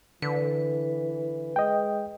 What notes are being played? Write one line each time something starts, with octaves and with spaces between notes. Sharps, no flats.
D3 E3 B4
G#3 D#5 G5